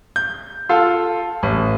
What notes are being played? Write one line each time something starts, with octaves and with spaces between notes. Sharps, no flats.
G6
F4 A4 F5
A1